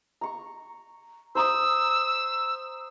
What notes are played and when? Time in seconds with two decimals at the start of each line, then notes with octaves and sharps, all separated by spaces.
0.21 A#5 C#6
1.35 C5 A#5 D#6 E6